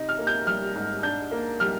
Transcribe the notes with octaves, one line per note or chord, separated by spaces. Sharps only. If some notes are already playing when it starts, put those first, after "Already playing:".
Already playing: C3 D#4
F6
A#3
G6
G3 F6
G#2
D4 G6
A#3
G3 F6